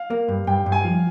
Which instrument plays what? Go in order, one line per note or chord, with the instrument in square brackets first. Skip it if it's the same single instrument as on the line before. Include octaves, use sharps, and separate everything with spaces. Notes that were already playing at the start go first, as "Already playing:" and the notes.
Already playing: [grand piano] F5
[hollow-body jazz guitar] A#3
G2
[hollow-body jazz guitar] G2 [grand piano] G5
[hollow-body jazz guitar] G2
[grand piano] G#5
[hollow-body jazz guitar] F3